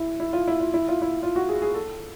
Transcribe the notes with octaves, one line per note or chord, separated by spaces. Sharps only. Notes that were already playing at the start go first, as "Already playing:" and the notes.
Already playing: E4
E4
F4
E4
F4
E4
F4
E4
F4
F#4
G#4
G#4
A4